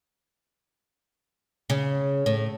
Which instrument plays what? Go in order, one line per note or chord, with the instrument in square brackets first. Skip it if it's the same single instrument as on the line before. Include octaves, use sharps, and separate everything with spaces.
[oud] C#3
A2